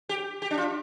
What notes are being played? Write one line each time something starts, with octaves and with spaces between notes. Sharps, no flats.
G4
G4
D4
F4